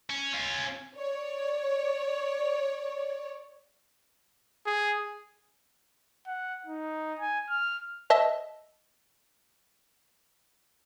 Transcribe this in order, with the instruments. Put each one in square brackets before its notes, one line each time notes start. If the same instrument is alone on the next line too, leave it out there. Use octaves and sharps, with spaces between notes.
[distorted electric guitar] C#4
C#4 F4
[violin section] C#5 D5
[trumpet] G#4
[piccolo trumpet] F#5
D#4
G#5
F6
[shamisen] D#5 E5 A5